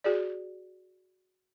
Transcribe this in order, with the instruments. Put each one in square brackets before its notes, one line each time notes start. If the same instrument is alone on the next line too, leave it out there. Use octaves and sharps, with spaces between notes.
[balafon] F#4 G#4 D5